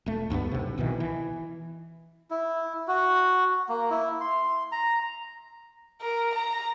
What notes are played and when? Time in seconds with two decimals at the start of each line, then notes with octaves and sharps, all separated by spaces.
0.06 E1 A3
0.30 D2 G2 A3 B3
0.52 B1 C3
0.78 B1 B2 D#3 E3
1.00 E3
2.31 E4
2.88 F#4
3.69 A#3
3.90 E4
4.21 C6
4.72 A#5
6.01 A#4
6.35 A#5